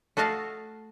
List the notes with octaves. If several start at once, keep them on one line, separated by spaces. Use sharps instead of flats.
A3 F#4 D#5 F5 A5